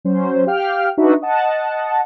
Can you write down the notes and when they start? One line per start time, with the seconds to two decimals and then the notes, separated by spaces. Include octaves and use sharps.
0.05 F#3 C#4 C5
0.47 G4 F5 G5 F6
0.98 D4 D#4 F#4 B4 E5
1.22 D#5 F#5 A5